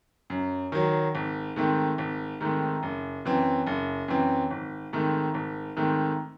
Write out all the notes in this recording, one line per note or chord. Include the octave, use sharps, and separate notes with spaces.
F#2
D#3 F#3
G#1
G#2 D#3 A3 C4
G#1
G#2 D#3 A3 C4
F#1
F#2 E3 C4
F#1
F#2 E3 C4
G#1
G#2 D#3 A3 C4
G#1
G#2 D#3 A3 C4